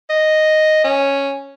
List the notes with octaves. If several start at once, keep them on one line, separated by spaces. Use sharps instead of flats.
D#5
C#4